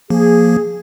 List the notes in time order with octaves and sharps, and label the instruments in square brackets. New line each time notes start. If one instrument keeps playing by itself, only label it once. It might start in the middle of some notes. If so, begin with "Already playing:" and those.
[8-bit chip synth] F3 A#3 [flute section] G#4